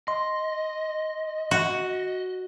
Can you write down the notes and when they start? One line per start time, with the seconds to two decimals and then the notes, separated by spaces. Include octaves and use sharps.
0.08 D#5 C6
1.51 F#4